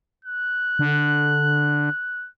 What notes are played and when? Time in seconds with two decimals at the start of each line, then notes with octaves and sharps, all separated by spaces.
0.25 F#6
0.79 D3